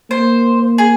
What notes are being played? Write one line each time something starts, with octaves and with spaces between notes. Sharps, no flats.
A#3 C5
G#4